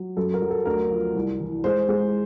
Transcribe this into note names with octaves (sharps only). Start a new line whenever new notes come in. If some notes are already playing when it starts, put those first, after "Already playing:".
Already playing: F#3
F#2 A4
A#4
F#3
A4
D2 A#4
F3
C2
E3
G#3 C5
G#3